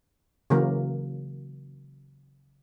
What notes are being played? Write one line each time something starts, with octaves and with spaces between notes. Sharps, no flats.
C#3 E3 F#3 A#3 A#4